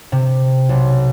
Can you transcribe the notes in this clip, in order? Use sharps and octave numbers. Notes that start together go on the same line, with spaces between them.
C3
B1